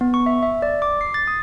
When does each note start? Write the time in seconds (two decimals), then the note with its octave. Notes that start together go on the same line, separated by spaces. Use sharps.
0.01 B3
0.14 C#6
0.26 E5
0.43 E5
0.62 D5
0.82 D6
1.01 C7
1.14 A6
1.27 D#6